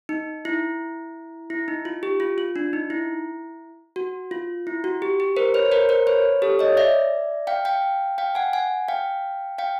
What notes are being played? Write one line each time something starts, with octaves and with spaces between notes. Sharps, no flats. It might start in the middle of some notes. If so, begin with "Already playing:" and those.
D#4
E4
E4
D#4
F4
G4
F4
F4
D4
D#4
E4
F#4
F4
E4
F#4
G4
G4
A#4 C5
B4 C#5
A#4 C5
A#4 C5
B4 C#5
G4 A4
C#5 D#5
D5 E5
F5 G5
F5 G5
F5 G5
F#5 G#5
F#5 G#5
F5 G5
F5 G5